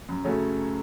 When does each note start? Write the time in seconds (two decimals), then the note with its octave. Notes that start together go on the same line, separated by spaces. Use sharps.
0.09 F#2
0.24 C#3 F#3 A3 C#4